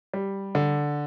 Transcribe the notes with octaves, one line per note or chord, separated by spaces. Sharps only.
G3
D3